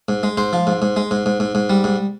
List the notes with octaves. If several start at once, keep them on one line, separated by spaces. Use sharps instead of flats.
G#2
G#3
G#2 C5
F3
G#2
G#2
G#3
G#2
G#2
G#2
G#2
G3
G#2